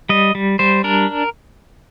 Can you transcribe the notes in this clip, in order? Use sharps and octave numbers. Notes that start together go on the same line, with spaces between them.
G3 D#5
G3
G3 C5
D4 A#4